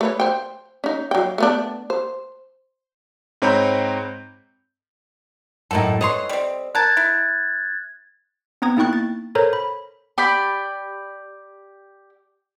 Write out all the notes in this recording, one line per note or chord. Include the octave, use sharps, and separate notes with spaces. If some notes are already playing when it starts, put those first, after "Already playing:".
A3 B4 C#5
C5 G5
C#4 D#4
F#3 G5
A3 B3 D4
C5
G#2 C4 C#5 A#5 B5 G6
F#2 A2 D#4 E4 A4
E3 C#5 D#5 C6
G3 C4
A#4 A5 F#6 G#6 A6
E4
B3 C4 A#5 D#6 G#6
A#3 D#4 E4 G5 C#6 F#6
A6
A4 A#4 C5 C#5 A#5 G6
B5
G4 D5 B5